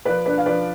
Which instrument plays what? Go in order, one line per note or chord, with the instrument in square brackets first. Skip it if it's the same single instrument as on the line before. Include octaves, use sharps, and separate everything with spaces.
[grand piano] F3 B4 D5
D4 B4 D5
F5
F3 B4 D5